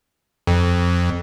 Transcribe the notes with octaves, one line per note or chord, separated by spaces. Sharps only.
F2